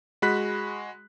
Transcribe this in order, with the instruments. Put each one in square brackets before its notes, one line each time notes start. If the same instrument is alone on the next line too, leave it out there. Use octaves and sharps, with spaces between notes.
[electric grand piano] G#3 F#4 B5 F#6 B6